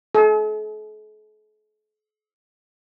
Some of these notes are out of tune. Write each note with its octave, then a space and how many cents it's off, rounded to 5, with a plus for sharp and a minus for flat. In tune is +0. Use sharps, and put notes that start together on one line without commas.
A4 -45